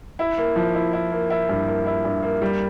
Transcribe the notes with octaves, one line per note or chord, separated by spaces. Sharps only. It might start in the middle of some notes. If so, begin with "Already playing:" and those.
E4
A#3
F3
E4
E4
A#3
E4
G2
A#3
E4
G2
A#3
G3